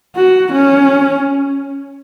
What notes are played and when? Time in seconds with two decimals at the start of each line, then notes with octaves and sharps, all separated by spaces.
0.16 F#4
0.52 C#4